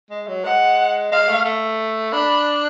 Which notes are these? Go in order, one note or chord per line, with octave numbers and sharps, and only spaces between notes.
G#3
F#3
G#3 F#5
G#3 F5
A3
A3
D4 B5